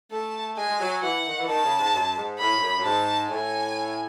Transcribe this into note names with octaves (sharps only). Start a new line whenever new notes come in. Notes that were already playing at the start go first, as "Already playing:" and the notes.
A3 A5
G#3 G#5
G#3
F#3
E3 F#5
D#3
E3
D#3 A5
C#3
G#2
F#2
G#2
A2 B5
G#2
F#2
F#2
G#2 A5
A2 G#5